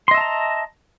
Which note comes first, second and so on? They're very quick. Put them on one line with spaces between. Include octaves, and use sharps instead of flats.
C6 D#5 E5 A5 A#5